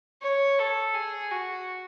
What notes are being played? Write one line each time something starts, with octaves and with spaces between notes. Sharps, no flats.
C#5
A4
G#4
F#4